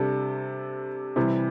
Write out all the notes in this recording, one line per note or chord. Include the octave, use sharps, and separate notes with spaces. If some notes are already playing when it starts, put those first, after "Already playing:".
Already playing: C3 G3 D4 A4
C3 E3 G3